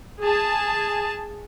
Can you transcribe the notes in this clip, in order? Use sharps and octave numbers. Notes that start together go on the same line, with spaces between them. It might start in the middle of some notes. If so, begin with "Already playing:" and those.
G#4 A5